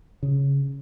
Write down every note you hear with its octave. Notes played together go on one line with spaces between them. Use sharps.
C#3